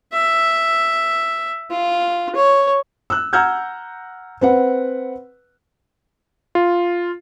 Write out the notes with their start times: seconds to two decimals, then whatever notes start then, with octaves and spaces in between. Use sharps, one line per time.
0.13 E5
1.71 F4
2.36 C#5
3.10 E6 F#6
3.33 F#5 A#5 E6 F6 G6 G#6
4.41 C4 B4 F#5
6.55 F4